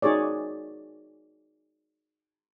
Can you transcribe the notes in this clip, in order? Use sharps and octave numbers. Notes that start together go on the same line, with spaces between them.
D#4 F#4 G#4 C#5 D5